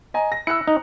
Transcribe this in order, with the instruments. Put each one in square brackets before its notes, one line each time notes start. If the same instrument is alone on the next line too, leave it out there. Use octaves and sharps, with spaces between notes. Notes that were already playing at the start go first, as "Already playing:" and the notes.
[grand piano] D#5 G#5 A#5
A#6
[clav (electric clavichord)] E4 [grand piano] E6 F#6 C#7
[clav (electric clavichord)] D#4 [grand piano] A#5